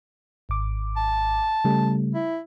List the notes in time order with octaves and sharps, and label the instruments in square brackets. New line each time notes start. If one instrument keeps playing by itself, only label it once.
[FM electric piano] G#1 D6
[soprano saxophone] A5
[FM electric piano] C#3 G3 A3
[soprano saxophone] E4